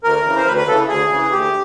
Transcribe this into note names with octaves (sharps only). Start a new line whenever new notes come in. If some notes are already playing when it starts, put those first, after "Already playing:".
D2 A#4
C#3 E3
C5
D2 B4
B4
C#3 E3 A4
D2 G#4
C#3 E3
D2 G4